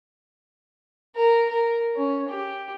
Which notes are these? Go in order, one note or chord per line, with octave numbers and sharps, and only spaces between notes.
A#4
A#4
C#4
G4